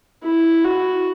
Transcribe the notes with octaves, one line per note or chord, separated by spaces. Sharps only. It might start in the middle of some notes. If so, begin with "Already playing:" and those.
E4
F#4